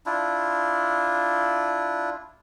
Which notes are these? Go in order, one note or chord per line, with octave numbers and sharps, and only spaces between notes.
D4 E4 F4